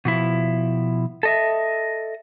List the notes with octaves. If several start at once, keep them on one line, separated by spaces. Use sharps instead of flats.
B2 F3 E4
A4 D#5 E5